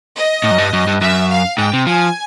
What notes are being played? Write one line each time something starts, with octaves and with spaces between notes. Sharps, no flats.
D#5
A2
F#2
G2
F#2
G2
F#2 E5
F5
G#2 G5
C3
F3 G#5